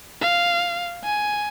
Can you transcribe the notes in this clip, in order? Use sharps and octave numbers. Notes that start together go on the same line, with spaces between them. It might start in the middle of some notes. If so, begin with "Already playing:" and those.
F5
G#5